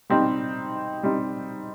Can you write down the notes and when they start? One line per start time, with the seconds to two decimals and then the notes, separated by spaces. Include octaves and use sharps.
0.10 G3 C4 D#4
1.03 G3 C4 D#4